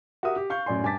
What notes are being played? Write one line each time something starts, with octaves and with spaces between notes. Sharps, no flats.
F#4 G4 A#4 E5 D#6
G4
F5 C#6 G6
F#2 A2 D5 G#5 C6
G2 G#5 A5 D6 A6 B6